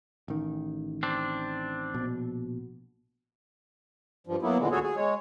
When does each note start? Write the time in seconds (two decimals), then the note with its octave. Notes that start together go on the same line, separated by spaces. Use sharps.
0.28 A1 D#3
1.03 C4 D4
1.94 A#1 B2
4.27 G2 F3
4.42 F#3 A#3 B3 E4
4.58 E2 A#2 D3 E3 G#3
4.72 D2 F#4 G#4 A4 C#5
4.83 G#4
4.96 G#3 C#5